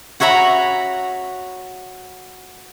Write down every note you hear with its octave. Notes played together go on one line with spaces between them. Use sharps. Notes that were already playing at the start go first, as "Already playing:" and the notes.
F#4 C#5 E5 A#5 B5